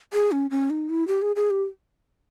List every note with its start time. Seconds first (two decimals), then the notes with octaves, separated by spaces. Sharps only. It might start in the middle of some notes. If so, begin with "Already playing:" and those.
0.13 G#4
0.32 C#4
0.51 C#4
0.70 D#4
0.89 E4
1.08 G4
1.22 G#4
1.36 G#4
1.50 G4